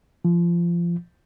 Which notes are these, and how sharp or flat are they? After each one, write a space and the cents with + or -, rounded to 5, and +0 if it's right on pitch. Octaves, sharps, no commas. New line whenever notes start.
F3 -25